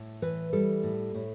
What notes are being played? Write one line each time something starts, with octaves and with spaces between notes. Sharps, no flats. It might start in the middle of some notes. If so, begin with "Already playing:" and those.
Already playing: A2
E3 B4
G3 A4
A2
A2